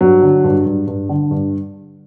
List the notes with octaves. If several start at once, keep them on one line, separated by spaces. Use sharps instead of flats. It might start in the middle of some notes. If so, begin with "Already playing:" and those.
G2 F#3
D3
G2
G2
G2
D3
G2